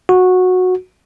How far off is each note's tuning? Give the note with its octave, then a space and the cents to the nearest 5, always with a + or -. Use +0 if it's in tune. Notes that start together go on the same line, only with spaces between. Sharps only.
F#4 -15